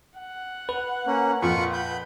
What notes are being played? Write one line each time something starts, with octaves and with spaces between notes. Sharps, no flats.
F#5
B4
A#3 C#4
F2 A#2 F4 B5 C#6
B5 G6